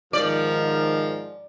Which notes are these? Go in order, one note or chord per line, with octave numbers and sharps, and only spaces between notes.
G#2 D#3 F3 A#4 D5